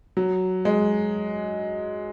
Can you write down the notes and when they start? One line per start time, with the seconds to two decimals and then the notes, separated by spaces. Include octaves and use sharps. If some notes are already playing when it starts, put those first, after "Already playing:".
0.17 F#3
0.65 G#3